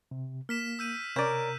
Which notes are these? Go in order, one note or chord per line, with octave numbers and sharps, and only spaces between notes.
C3
A#3 F6 B6 E7
E6 G6 D#7
C3 C#4 A#4 D5 G6